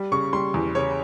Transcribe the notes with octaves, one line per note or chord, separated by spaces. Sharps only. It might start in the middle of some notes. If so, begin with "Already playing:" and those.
Already playing: G3
C#3 C#6
G3 C6
E2
C#3 C#5